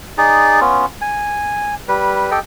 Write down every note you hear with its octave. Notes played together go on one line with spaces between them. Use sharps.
D#4 G#4 D5
B3 C#4 F4
G#5
G3 B4
G4 A4 D#5 G5